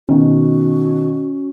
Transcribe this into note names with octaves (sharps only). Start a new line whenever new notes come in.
B2 D#3 C#4 F#4